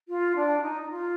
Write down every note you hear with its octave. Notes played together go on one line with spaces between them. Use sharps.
F4
D4
F4
D#4
D#4
F4